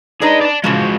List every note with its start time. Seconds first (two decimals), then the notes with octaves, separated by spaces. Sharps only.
0.21 D4 D#4 G#4 B4 D#5
0.41 D5 A5
0.64 C#3 E3 F3 G#3 F#4